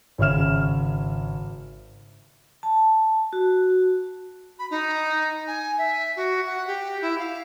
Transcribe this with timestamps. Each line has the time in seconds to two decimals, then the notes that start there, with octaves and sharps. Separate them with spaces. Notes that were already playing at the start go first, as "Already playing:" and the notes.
0.18 G#1 C#3 C#5 E5 F6 E7
2.63 A5
3.33 F#4
4.59 B5
4.71 D#4
5.47 G#5
5.78 E5
6.16 F#4
6.47 F#5
6.67 G4
7.02 E4
7.18 F5